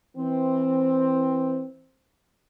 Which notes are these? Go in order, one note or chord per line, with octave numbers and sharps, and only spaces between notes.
E3 C4